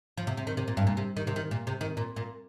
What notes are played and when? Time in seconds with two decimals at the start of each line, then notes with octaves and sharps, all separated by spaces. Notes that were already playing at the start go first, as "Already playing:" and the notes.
0.18 F3
0.27 C3
0.37 C3
0.47 D#3
0.57 C3
0.68 A#2
0.77 G2
0.87 A#2
0.97 C3
1.17 D#3
1.27 C3
1.36 D#3
1.51 A#2
1.67 C3
1.81 D#3
1.97 A#2
2.16 A#2